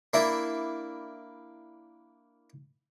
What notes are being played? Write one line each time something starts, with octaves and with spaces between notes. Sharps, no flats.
A#3 D4 E4